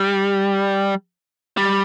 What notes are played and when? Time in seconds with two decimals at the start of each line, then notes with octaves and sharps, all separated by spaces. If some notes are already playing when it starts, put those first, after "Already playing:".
Already playing: G3
1.57 G3